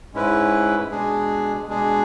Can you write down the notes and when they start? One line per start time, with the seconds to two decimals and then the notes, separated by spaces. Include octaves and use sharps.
0.13 G#2 G#3 C#4 E4 B4
0.91 B2 G#3 D4 G#4
1.67 B2 G#3 D4 G#4